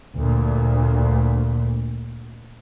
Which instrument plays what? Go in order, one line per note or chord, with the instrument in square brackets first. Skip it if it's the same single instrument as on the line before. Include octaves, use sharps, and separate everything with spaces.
[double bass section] D2 A#2